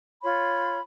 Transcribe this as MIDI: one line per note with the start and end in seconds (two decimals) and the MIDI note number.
0.22 0.78 65
0.22 0.78 73
0.22 0.81 83
0.22 0.78 84